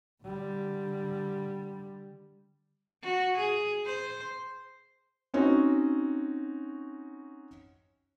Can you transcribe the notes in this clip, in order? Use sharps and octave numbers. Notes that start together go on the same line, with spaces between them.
D3 G3
F#4
G#4
C5
C4 C#4 D#4 F#4